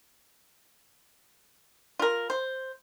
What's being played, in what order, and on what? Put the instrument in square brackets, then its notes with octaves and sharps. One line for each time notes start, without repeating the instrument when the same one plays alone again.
[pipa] F4 A#4
C5